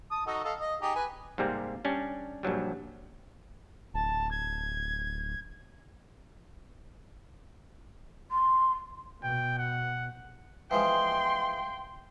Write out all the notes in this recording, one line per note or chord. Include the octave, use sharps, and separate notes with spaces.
A5 D#6
D#4 F#4 A4
A4 D#5 F5
D#5
D#4 G4 G#4
B4 G#5
G#2 C3 G3 A#3 C4
G3 C#4 D4
A#1 G2 F#3 G3
D1 A5
G#6
C6
B2 G5
F#5
E3 F3 G#3 G5 C6